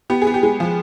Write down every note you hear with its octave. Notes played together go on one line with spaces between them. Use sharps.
B3 G4
G#4
B3
G4
G#3
F3